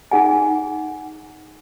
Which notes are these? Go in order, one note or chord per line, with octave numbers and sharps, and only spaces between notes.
D#4 G#4 F#5 G#5